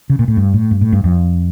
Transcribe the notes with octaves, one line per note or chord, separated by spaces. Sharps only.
C#3
A#2
A2
G2
A2
G2
A2
G2
F2